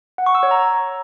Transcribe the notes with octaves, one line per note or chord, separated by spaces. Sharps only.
F#5
C#6
E6
C#5
A#5